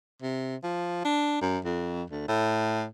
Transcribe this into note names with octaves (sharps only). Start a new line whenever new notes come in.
C3
F3
D4
F#2
F2
D2
A2